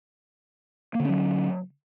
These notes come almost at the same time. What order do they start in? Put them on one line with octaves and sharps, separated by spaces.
A#3 D3 C#4 F#3